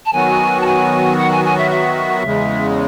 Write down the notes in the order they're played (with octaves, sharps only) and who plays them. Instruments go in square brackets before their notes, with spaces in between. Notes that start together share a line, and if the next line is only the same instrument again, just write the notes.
[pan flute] A5
[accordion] D#3 F#3 B3 F#4 [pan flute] G#5
[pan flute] A5
G#5
F#5
G#5
G#5
E5
E5
[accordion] E2 C#3 G#3